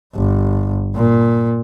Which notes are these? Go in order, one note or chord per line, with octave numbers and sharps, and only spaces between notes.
G1
A#2